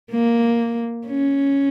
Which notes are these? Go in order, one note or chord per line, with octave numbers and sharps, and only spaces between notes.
A#3
C#4